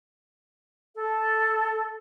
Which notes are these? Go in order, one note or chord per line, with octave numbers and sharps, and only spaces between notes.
A4